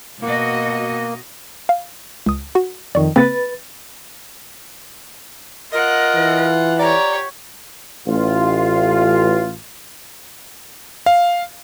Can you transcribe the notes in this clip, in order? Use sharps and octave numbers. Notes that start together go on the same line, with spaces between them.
B2 A#3 F#4 D#5
F5
C#2 D#6
F#4 F#5
F2 D#3 D5 C#6
C#3 A#3 C4 B4 A6
F4 A#4 D#5 F#5
E3
G4 C#5 D5 A#5
A1 F4
F5